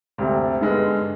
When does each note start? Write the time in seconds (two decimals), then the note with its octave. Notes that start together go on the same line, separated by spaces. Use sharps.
0.18 D2 C3 G3
0.61 G2 D3 G#3 B3